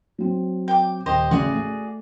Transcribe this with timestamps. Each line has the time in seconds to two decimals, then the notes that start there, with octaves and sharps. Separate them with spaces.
0.18 F#3 C4
0.68 G5 D6
1.06 D#1 G4 C5 D#5
1.31 A1 F#4 G#4 D5
1.53 A3